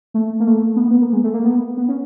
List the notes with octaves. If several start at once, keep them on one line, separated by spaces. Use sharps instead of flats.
A3
A#3
A3
B3
A#3
B3
A#3
G#3
A3
A#3
B3
B3
C#4